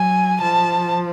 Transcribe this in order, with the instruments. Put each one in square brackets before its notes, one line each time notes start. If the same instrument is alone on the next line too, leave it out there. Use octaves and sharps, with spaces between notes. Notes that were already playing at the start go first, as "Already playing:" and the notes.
Already playing: [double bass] F#3 [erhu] G#5
[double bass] F3 [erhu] A5